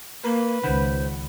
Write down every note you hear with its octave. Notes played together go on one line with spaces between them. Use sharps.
A#3 A#4 B4
C#2 D#3 C5 F#5 B5